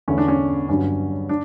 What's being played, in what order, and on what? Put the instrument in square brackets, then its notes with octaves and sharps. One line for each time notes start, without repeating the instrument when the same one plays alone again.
[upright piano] E2 D3 A3 C#4
D4
C#4
G1 G2 D3 F#3 C#4
D4